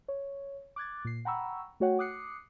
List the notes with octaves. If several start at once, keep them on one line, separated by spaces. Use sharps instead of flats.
C#5
D6 F#6 G#6 A6
A#2 C7
F#5 G5 A#5 B5 C#6 E6
A3 F#4 C#5 F#5 G5
D6 D#6 F#6 C7 C#7